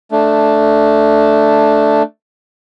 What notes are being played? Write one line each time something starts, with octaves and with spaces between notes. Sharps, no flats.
A3 D4